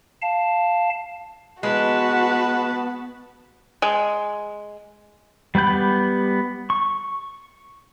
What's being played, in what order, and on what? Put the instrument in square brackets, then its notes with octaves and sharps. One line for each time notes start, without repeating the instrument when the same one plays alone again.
[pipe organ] F5 A5
[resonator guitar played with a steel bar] G#3 [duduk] B3 [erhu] F#4 [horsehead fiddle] B4 A5
[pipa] G#3
[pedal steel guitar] G3 B3 B5 G6
C#6